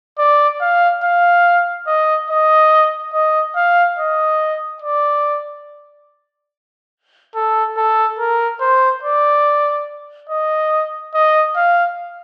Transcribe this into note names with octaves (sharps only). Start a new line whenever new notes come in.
D5
F5
F5
D#5
D#5
D#5
F5
D#5
D5
A4
A4
A#4
C5
D5
D#5
D#5
F5